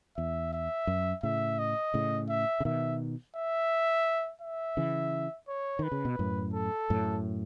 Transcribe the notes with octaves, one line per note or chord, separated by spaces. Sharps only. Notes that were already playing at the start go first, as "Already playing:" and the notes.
E2 E5
E5
F#2
A2 C#3 E5
D#5
A2 C#3
E5
C#3
B2 D#3 E5
E5
E5
C#3 E3
C#5
D#3 B4
C#3
B2
F#2 A2
A4
F#2 A2